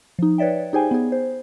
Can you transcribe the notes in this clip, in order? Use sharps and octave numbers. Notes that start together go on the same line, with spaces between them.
F3 D#4
B4 C#5 D5 E5 G5
D#4 G4 G#4 C5 G5 G#5
B3 G#4
C5